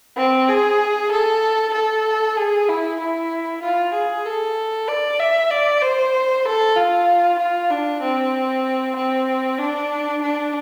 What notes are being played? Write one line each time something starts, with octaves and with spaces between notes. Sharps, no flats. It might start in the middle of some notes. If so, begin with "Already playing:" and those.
C4
G#4
A4
A4
G#4
E4
E4
F4
G#4
A4
D5
E5
D5
C5
A4
F4
F4
D4
C4
C4
D4
D4